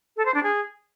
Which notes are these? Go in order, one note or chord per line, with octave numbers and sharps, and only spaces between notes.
A4
C5
D4
G#4